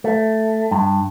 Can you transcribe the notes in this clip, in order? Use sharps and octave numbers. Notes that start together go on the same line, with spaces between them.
A3
G2